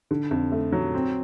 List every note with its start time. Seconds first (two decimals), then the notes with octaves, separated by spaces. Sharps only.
0.11 D3
0.31 F2
0.52 A3
0.72 F#3
0.94 C4